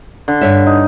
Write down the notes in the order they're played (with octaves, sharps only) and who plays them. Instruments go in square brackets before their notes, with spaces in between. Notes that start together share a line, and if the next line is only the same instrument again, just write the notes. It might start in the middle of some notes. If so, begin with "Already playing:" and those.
[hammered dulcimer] D3
[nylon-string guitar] G2 C#5 E5
[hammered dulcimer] D#4